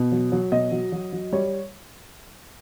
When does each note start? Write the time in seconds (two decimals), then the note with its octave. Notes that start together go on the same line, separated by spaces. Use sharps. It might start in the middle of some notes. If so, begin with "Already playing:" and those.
Already playing: B2
0.12 F#3
0.32 F#3
0.52 B2 D#5
0.72 F#3
0.92 F#3
1.13 F#3
1.32 G3 C#5